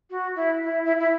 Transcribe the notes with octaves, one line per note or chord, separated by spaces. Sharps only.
F#4
E4
E4
E4
E4